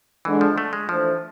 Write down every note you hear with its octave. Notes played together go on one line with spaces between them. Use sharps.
D3 E3 G#3 D4
F3
A3
G#3
E3 F3 A3 D4 A4 C5